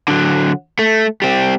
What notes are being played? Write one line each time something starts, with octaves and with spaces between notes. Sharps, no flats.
D3 F#3
A3
G3 C4